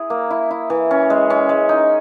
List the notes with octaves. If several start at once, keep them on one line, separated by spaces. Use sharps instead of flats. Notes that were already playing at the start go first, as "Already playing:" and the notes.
Already playing: E4 G#4
A#3
E4
E4
E3
C#4
G#3
C#4
G#3
D#4